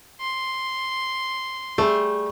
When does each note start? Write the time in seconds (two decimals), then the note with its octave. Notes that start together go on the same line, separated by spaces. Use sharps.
0.21 C6
1.78 G3 A3 G#4